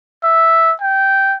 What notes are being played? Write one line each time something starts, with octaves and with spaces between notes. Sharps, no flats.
E5
G5